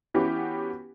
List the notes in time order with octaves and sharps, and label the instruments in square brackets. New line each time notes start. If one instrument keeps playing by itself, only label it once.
[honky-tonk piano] E3 B3 C#4 F#4 G4